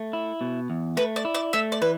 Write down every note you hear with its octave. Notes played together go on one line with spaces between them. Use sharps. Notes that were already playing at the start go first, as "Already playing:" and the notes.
Already playing: A3
E4
B2
E2
A3 B4
D5
E4
D5
A3 E5
D5
E3 B4